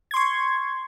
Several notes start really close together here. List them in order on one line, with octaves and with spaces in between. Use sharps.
G#6 C6 C#6